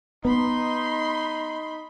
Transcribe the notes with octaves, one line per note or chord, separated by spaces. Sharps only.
B3 D#4 B5 C6